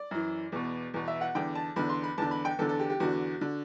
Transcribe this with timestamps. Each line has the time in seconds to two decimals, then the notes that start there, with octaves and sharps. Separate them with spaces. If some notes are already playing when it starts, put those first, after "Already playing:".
Already playing: D5
0.11 F#2 E3
0.52 E2 B2
0.94 E2 B2
1.08 E5
1.21 F#5
1.35 E2 D3 G5
1.55 A5
1.76 E2 D3 B5
1.89 C6
2.03 B5
2.18 E2 D3 A5
2.31 B5
2.45 G5
2.58 E2 A4
2.62 D3
2.69 A4
2.79 G4
2.90 G4
3.00 E2 D3 F#4
3.41 D3